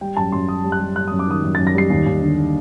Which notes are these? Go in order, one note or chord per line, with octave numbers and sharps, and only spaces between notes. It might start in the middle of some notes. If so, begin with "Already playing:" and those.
G3 G5
F#2 A5
F#2 C6
F#2 D#6
G3
F#6
G3
G3 F#6
D#6
F#2
D6
D#3 D#6
F#2
A6
F#2
A#6
G3 C7
D#2
D#2
D3